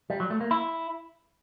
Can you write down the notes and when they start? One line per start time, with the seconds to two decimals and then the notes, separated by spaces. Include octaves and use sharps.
0.10 G3
0.20 F#3
0.30 A3
0.41 A#3
0.51 E4